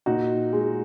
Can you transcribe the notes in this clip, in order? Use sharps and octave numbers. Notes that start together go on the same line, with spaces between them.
A#2 D#4 F#4
G#3